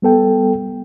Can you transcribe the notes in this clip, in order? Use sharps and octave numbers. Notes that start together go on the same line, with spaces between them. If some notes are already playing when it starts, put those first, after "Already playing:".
G3 B3 A4 G5